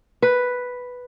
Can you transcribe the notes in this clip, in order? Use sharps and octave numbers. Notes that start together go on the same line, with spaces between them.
B4